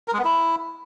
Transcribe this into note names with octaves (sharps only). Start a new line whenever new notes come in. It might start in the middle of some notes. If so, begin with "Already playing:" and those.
A#4
G#3
B3
E4